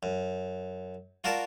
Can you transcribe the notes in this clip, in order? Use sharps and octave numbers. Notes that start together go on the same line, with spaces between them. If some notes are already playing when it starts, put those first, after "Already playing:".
F#2
F4 F#4 A#4 D5 A5